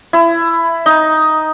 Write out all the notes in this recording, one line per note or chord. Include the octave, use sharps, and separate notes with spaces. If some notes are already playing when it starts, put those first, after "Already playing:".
E4
D#4